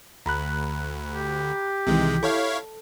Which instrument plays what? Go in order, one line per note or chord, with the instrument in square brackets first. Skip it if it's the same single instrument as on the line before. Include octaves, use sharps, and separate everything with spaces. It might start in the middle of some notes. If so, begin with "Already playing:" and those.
[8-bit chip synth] D2 [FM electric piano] A#5 B5 F#6
[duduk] G4
[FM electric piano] C2 D#3 E3 [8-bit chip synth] C3 G#3
[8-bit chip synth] E4 C#5 F5 [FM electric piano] A4